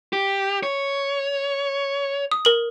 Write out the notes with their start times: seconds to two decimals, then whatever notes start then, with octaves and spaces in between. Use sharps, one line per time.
0.13 G4
0.63 C#5
2.31 D#6
2.45 A#4 F#7